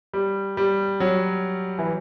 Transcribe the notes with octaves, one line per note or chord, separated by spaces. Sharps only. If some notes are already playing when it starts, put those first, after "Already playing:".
G3
G3
F#3
E3